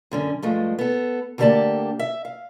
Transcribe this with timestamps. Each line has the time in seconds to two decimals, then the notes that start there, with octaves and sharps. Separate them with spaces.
0.11 F#2 D3 C#4
0.42 G2 F3 G#3 A3
0.79 B3 A4
1.38 D2 D3 A#3 G4 D5 A5
1.99 E5
2.25 F5